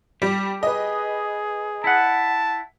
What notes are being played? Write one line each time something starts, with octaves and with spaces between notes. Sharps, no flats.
G3 G4
G#4 B4 D#5
E4 F#5 A5